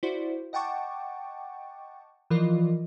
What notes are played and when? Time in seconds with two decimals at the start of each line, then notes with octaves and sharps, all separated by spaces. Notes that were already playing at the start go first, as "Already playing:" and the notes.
0.03 E4 F#4 C5 D5
0.53 D#5 F#5 G5 A5 C#6 D6
2.30 E3 F3 F4 A#4 D5 D#5